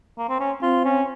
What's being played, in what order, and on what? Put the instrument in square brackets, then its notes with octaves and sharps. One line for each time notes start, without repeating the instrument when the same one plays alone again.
[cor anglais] A#3
C4
C#4
[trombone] C4 [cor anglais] F4
[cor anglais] C#4